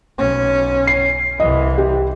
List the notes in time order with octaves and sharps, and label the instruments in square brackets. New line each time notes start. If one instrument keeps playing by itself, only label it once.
[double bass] B1 C#4
[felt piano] C7
[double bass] C2 E3 [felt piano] D#5
[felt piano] G4